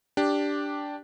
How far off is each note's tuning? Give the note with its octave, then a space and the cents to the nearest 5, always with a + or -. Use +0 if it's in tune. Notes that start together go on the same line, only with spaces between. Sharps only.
D4 -5 G4 +0